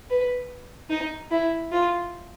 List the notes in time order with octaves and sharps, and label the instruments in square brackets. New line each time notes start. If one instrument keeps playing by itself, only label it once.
[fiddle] B4
D#4
E4
F4